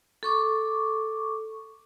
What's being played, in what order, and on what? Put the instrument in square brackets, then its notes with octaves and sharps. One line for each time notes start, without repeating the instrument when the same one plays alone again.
[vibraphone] A4 C#6 D6